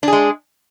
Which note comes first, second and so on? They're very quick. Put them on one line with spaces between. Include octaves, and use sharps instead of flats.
D4 G#4 G#3